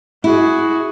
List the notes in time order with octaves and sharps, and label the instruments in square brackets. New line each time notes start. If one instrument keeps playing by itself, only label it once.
[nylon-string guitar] E4 [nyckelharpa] F#4 G#4